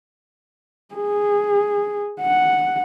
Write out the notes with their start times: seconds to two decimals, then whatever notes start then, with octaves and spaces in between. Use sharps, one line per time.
0.95 G#4
2.21 F#5